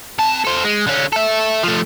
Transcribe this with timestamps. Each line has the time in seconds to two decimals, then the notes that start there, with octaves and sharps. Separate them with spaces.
0.18 C3 A5
0.45 A4 C5
0.64 G#3
0.87 D3 C#4
1.13 A4 E5
1.63 F3 A3